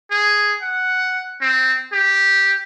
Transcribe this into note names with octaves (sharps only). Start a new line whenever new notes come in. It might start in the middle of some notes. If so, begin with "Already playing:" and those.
G#4
F#5
C4
G4